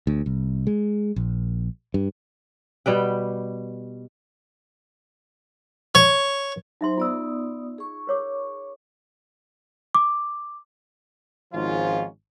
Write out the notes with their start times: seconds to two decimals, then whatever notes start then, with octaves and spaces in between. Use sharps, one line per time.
0.07 D2
0.26 C2
0.67 G#3
1.16 A#1
1.94 G2
2.86 B2 G3 B4 G5
5.95 C#5
6.81 F#3 D#4 C5 E5 C6
6.98 B3 F4 D5 D#6 E6
7.78 G#4 C#6
8.07 A#4 C#5 D6
9.95 D6
11.53 G#1 G#2 F3 C#4 F4